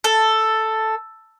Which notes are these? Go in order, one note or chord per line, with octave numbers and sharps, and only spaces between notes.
A4